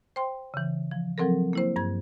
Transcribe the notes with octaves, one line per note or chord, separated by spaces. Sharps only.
C5 G5 C6
C#3 E3
F3
F3 F#3 C4 A4 A#4
A#3 E4 C5
G2 G#6